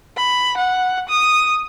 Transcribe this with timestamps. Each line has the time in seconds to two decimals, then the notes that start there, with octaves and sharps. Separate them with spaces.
0.17 B5
0.57 F#5
1.09 D#6